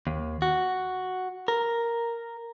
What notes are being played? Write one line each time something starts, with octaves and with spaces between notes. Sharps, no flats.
D#2
F#4
A#4